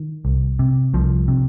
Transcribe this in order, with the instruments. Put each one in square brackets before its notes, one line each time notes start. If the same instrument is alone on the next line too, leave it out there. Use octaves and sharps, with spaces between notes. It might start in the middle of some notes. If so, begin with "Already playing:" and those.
Already playing: [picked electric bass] D#3
C2
C3
C2 F3
C3